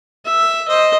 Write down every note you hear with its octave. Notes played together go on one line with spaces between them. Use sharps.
E5
C5 D#5